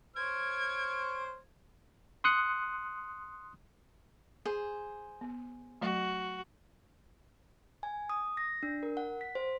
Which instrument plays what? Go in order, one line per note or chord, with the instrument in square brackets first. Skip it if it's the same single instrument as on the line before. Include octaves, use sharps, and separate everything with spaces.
[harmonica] C5 C#5 F6 [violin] G#6 D7
[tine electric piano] C6 D#6 F#6 C#7
[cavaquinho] G#4 C5
[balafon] B3
[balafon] F#3 A3 [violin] F#4
[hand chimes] G#5
D#6
A#6
D4
A#4
F#5
B6
C5